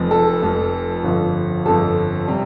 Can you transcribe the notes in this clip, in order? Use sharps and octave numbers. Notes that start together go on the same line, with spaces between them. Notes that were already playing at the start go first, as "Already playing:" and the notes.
Already playing: F1 F2 F3
A4
F1 F2 F3
G1 F2 F3
G1 F2 F3 A4
C3 G3